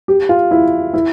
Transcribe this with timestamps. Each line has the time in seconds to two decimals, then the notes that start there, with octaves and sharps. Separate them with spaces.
0.08 G4
0.29 F4
0.51 E4
0.94 E4